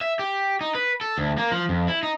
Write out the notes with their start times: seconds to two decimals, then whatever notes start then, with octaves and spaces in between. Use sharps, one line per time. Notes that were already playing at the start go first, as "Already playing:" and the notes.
0.01 E5
0.19 G4
0.61 D#4
0.75 B4
1.01 A4
1.18 D2
1.38 A#3
1.52 F3
1.69 F2
1.88 E4
2.03 D#4